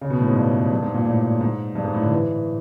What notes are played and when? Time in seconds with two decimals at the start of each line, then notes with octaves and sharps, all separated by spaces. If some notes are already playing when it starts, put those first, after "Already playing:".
0.01 C#3
0.10 B2
0.19 A2
0.28 G#2
0.36 G2
0.72 G2
0.83 G#2
0.94 A#2
1.06 A2
1.41 G#2
1.75 G2
1.84 G#2
1.93 A2
2.02 D3
2.11 E3